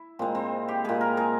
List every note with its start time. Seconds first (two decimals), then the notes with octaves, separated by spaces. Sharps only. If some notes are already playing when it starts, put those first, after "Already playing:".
Already playing: E4
0.19 A#2 G#3 C4
0.35 C4
0.68 G4
0.84 A#2 G#3 G#4
1.01 A#4
1.17 G#4